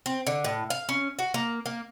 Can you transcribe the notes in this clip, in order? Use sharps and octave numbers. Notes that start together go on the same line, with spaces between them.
C4
D3
A2
F5
C#4
F#4
A#3
A#3